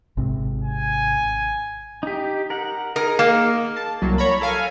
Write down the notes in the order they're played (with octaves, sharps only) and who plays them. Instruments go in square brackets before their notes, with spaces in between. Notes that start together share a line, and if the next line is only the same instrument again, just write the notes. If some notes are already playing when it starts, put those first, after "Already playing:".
[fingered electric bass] G#1 C3
[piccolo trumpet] G#5
[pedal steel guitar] D#4 G4
A#4 F#5
[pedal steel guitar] D#4 G#4 [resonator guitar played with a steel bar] A#4
[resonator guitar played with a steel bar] A#3
[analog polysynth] A5
C2 F#3 A#3
C#5 A#5 B5
A4 A#4 F5 G#5